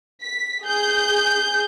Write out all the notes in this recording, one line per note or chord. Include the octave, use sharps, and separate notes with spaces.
B6
G#4 G6